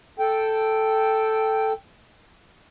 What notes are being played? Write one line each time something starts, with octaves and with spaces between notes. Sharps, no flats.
A4 G5